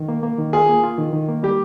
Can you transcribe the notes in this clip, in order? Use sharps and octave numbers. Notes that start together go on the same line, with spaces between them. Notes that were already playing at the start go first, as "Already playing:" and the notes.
Already playing: D#3
A#3
A#3
D#3
F4 G#4
A#3
F4
D#3
D#3
A#3
G3 G4